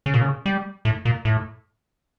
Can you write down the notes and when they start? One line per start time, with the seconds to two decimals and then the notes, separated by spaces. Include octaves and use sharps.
0.06 C#3
0.14 A#2
0.21 C#3
0.46 G3
0.85 A2
1.05 A#2
1.25 A2